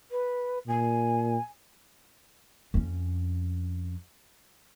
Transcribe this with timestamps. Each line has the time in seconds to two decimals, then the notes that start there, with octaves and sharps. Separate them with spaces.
0.11 B4
0.67 A#2 G#5
2.74 F2 C#4